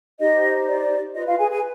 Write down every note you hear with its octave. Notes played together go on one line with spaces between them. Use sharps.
D#4 G4 C5 D#5
D5
F4 B4 D#5
F4 F5
G#4 G#5
G#4 G#5